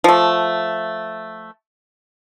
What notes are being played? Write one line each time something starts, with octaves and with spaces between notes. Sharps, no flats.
F3 A3